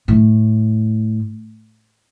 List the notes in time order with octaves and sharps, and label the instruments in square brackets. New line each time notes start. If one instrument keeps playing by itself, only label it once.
[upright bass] A2